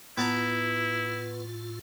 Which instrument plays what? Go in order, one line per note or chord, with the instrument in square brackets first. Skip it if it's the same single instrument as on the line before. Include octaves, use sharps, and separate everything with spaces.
[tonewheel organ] A2 F4 [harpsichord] B3 A5 A#5 [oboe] E4